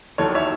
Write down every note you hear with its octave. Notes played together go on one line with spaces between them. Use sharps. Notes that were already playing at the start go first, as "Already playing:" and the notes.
D#2 D#3 F#3 A4 C#5
C#5 E5